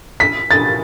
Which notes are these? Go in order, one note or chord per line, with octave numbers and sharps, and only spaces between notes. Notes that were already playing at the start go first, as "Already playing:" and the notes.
B6
A6